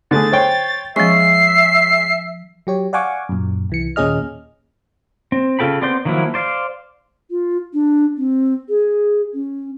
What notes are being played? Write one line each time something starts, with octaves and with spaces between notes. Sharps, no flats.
D3 A3 G#4 A6
C5 C#5 G5
F3 G#3 C#4 E5 C#6 C7
F#3 G4 C#5
D5 F5 F#5 G#5 C#6 D6
F#2 A#2
C2 E3 C#7
D#2 A#2 C#4 G#4 D#5 F6
C4
C#3 F4 A4 G5 B5
B3 C4 D5 C6 G6
D#3 F3 F#3 A#3 E4
C5 D5 F5
F4
D4
C4
G#4
C#4